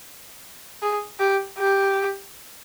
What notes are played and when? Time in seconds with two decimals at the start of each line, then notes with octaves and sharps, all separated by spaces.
0.82 G#4
1.20 G4
1.58 G4